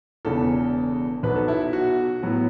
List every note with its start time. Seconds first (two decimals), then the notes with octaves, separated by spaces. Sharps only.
0.25 E1 E2 C#3 E3 A4
1.23 B1 B2 F#3 B3 B4
1.35 A4
1.48 E4
1.73 F#4
2.22 A2 F#3 B3